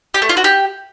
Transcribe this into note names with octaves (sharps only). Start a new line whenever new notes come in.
G4
A3
F4
F#4
G4